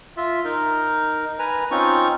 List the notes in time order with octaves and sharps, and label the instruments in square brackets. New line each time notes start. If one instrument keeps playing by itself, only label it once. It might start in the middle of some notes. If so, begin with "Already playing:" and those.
[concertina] F4 E5
D#4 A#4
B4 G#5 A#5
C4 C#4 D#4 F4 C#6